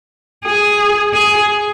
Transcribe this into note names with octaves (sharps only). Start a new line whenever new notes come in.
G#4
G#4